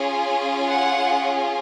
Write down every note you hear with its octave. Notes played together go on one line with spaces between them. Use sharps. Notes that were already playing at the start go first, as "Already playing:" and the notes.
Already playing: C#4 F4 G#4
F#5